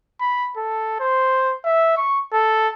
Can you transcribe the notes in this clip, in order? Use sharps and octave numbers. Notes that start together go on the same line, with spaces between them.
B5
A4
C5
E5
C#6
A4